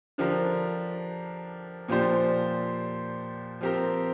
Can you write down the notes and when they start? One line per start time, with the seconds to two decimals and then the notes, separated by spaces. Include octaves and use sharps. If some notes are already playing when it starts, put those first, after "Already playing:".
0.18 D3 F3 D4 G4 A#4
1.88 A#2 F3 D4 G4 C5
3.61 F3 C4 G4 A#4